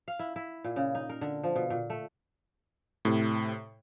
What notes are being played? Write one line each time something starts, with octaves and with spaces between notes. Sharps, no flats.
F5
E4
E4
A#2
C#3
D#4
A#4
D3
F3
B2
A#2
A3
A2 C3